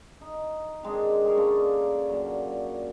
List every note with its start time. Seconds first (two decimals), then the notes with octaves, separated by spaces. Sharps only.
0.21 D#4
0.83 D#3 G#3 C4 D4
1.26 G#4 A#4 C#5
1.37 D3 A#3 C#4 D4
2.09 A#2 F#3